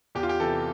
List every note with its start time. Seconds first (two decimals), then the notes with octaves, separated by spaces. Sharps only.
0.15 E2 G4
0.23 F4
0.29 G4
0.40 C3 E3 A4